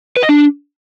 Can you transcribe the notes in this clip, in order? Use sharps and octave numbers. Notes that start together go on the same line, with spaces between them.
B4
D#5
D4